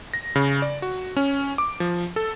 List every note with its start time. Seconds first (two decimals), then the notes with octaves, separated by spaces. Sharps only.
0.14 A#6
0.36 C#3
0.62 D5
0.82 F#4
1.17 C#4
1.58 D6
1.80 F3
2.16 A4